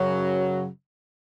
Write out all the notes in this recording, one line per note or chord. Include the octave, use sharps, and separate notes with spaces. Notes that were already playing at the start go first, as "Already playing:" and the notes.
Already playing: F#2 C#3 F#3